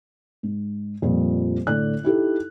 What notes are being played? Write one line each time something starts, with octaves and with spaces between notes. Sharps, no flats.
G#2
F2 A#2 G3
A2 D3 D5 F#6
D#4 E4 G4 A4